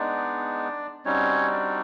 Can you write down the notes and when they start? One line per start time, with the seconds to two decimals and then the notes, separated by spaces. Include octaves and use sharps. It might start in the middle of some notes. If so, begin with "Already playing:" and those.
Already playing: G#3 B3 D4 D#4 D5
1.05 G3 C4 C#4 D#4 F#4 C#5
1.52 D4 D5